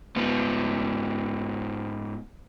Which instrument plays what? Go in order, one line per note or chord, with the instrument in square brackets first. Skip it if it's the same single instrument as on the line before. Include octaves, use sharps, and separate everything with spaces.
[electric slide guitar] G#2 B3